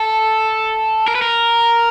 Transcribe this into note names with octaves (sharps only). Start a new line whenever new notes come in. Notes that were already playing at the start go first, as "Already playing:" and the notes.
Already playing: A4
A#4
B4
A#4